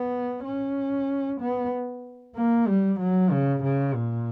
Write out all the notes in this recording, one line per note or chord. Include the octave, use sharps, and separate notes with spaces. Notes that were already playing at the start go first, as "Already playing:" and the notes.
Already playing: B3
C#4
B3
A#3
G3
F#3
C#3
C#3
A#2